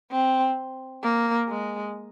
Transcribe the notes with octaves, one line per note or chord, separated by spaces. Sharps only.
C4
A#3
G#3